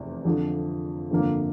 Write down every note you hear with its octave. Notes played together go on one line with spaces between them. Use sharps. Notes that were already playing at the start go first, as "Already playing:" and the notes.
Already playing: F1 E2 C3
F2 D3 F3
G1 F2 D3 F3 A#3